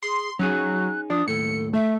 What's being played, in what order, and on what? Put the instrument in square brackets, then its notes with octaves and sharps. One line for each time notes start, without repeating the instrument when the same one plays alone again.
[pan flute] G#4 [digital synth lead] C6
[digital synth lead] F#3 [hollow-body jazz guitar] C#4 D#4 G#4 [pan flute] F#6
[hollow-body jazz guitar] F3 [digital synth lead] D4 [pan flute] D#6
[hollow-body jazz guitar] D#2 A2 [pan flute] A4 [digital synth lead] C#7
[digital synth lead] A3 [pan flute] E5